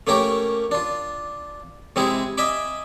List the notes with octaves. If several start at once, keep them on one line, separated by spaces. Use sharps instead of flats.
A3 A#3 C#4 G4 A#4
D4 F4
C3 G#3 C4 E4 G#4
D#5 E5 G#5 B5 D6